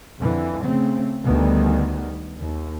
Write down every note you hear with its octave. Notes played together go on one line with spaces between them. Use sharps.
F2 D3 E3
C#3 A3 C4
D2 D3 D#3 G3 B3
D#2